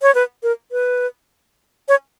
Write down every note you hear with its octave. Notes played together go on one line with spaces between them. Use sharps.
C#5
B4
A#4
B4
C#5